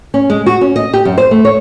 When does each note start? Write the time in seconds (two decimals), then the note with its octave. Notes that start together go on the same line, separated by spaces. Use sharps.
0.14 C#4
0.30 G#3
0.46 F#4
0.61 C#4
0.76 D#5
0.93 G4
1.05 F#2
1.18 C5
1.31 A3
1.45 C#5